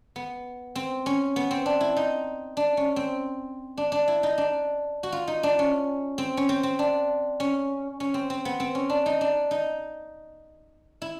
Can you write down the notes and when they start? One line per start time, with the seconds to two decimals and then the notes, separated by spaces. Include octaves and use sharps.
0.16 B3
0.75 C4
1.06 C#4
1.36 B3
1.51 C4
1.66 D4
1.81 E4
1.97 D#4
2.57 D4
2.77 C#4
2.96 C4
3.78 D4
3.92 D4
4.08 E4
4.23 D#4
4.38 D4
5.03 F#4
5.12 F4
5.27 D#4
5.43 D4
5.59 C#4
6.18 C4
6.37 C#4
6.49 C4
6.63 C4
6.79 D4
7.40 C#4
8.00 C#4
8.14 C4
8.30 C4
8.45 B3
8.60 C4
8.75 C#4
8.90 D4
9.06 D#4
9.21 D4
9.51 D#4
11.02 E4